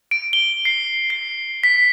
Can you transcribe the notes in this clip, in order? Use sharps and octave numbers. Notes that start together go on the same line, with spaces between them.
D7
G7
C7
C7
B6